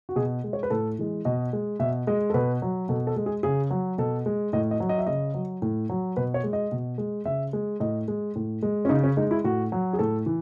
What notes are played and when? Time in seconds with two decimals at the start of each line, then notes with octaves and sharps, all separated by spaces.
0.09 F#4
0.16 B2 G#4
0.44 G#3
0.53 C#5
0.63 B4
0.70 A2 A4
0.99 E3 G#3
1.25 B2 D#5
1.53 G#3
1.79 B2 E5
2.07 G#3 D#5
2.30 A4
2.34 B2 B4
2.62 F#3
2.89 B2 A4
3.07 A4
3.16 G#3
3.26 G#4
3.43 C#3 G#4
3.70 F#3
3.98 B2 A4
4.26 G#3
4.53 A2 D#5
4.71 D#5
4.80 F#3
4.89 D#5
4.98 E5
5.06 C#3 D#5
5.34 F#3
5.62 A2
5.89 F#3
6.17 B2 B4
6.34 C#5
6.44 G#3
6.53 D#5
6.72 B2
6.98 G#3
7.25 C#3 E5
7.53 G#3
7.80 A2 D#5
8.08 G#3
8.36 A2
8.63 G#3
8.85 C#4
8.89 C#3 D#4
9.04 C#4
9.17 G#3 D#4
9.31 E4
9.44 A2 F#4
9.72 F#3
9.93 G#4
9.99 A2 A4
10.26 E3